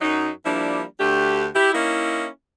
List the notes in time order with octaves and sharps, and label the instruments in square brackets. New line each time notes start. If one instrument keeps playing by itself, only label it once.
[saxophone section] F#2 F#3 D#4
F3 G3 A#3 D4 E4
D2 A3 D4 G4
E4 G4
A#3 C#4 D#4 E4